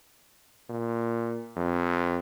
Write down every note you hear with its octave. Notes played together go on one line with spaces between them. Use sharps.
A#2
F2